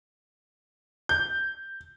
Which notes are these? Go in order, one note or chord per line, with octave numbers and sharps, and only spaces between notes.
G6